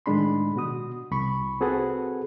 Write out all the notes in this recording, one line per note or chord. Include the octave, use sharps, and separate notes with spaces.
A2 D#3 G#3 D4 B5 C6
B2 F#4 D#6
C2 B5 C#6
C4 F#4 G#4 A4 B4 F#5